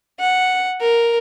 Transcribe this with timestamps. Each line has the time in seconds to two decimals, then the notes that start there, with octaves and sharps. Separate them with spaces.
0.20 F#5
0.81 A#4